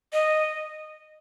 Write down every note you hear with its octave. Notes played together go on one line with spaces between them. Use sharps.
D#5